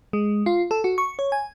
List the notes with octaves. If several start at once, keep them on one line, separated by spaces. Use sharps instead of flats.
G#3
F4
A4
F#4
C#6
C#5
G#5